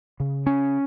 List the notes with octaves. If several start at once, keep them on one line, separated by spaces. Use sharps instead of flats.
C#3
C#4